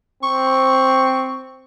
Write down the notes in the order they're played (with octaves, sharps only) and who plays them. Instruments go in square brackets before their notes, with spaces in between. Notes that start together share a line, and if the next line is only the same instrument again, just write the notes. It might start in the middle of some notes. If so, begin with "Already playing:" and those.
[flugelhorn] C4 [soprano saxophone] C#6